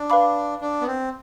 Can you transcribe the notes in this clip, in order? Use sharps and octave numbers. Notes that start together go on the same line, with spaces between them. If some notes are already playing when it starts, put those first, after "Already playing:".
Already playing: D4
B4 F5 B5 D6
D4
B3
C4